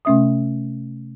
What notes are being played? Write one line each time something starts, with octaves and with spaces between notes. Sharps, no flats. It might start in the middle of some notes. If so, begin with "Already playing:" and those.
C3 A3 C#4 E5 D#6